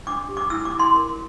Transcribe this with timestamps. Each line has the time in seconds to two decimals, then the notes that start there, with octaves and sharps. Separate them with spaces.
0.07 D4 D6
0.29 G4
0.37 D6
0.50 E4 E6
0.65 D6
0.72 E4
0.79 C6
0.94 A#4